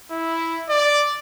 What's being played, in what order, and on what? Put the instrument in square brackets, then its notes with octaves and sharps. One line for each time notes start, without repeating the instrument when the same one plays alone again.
[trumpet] E4
D5